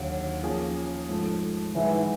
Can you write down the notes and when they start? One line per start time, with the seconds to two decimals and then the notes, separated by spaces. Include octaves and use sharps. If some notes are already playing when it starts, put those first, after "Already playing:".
Already playing: D#2 D3 F#3
0.43 F3 A#3 C#4 F4 G#4
1.09 G#2 F3 A3
1.74 G#2 D#3 E3 F#3